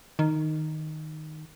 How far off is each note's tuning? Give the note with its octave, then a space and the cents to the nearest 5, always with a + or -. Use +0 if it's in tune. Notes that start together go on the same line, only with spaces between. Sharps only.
D#3 -5